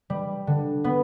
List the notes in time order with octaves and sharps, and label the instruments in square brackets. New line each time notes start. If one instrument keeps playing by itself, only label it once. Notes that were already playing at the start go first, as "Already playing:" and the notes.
[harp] G3
D3
B3